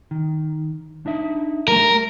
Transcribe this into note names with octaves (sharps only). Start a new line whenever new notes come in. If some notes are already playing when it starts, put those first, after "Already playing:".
D#3
D4 D#4 E5
G3 A3 A#4